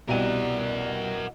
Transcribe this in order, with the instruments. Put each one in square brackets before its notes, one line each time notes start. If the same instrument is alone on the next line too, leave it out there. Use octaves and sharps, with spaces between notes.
[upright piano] C2 G4 D#7 [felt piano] B2 [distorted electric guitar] A#4 F#5 [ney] D5